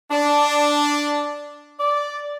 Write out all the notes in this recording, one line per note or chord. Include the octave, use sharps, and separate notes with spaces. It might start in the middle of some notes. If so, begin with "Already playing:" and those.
D4
D5